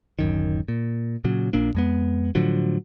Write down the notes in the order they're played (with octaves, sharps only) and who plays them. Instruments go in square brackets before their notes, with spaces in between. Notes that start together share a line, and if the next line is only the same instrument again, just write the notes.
[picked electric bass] D1 F#2 D#3
A#2
A#2 C#3 F#3
A#1 A#2 A#3 D4
F2 G#3 B3
A2 D3 F3 F#3